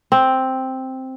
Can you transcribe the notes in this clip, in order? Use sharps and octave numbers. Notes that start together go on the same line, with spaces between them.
C4